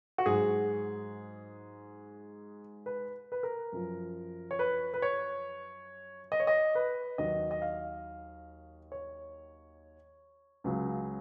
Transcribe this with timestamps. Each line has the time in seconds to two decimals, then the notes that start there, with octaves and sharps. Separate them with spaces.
0.18 F#4
0.26 G#2 F#3 G#4
2.86 B4
3.32 B4
3.43 A#4
3.72 F#2 F3
4.51 C#5
4.59 B4
4.94 B4
5.02 C#5
6.32 D#5
6.40 C#5
6.47 D#5
6.75 B4
7.18 D#2 D#3 F#3 D#5
7.51 D#5
7.62 F5
8.92 C#5
10.64 C#2 C#3 F#3